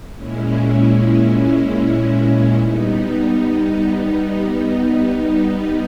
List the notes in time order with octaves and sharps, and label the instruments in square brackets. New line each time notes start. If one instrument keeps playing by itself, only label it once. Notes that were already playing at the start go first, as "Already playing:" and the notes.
[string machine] A#2 G#3 C#4 E4
G3 B3 D#4